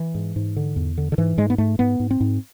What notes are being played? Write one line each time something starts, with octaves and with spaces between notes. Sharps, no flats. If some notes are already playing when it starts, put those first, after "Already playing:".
Already playing: E3
G#2
G#2
D3
E2
D3
D3
G#2 E3
G#2 G#3
B3
G#2 A3
G#2 B3
G#2
C4
G#2